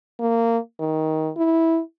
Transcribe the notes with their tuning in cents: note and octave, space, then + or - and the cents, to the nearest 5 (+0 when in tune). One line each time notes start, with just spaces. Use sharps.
A#3 -20
D#3 +15
E4 -10